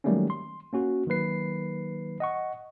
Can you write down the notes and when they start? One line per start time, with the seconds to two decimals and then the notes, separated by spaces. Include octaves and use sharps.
0.04 D#3 F#3 G3 A3 A#3 C#4
0.30 C6
0.73 A#3 C#4 F#4
1.07 D#3 F#3 A#3 B4 C7
2.20 D#5 F#5 C#6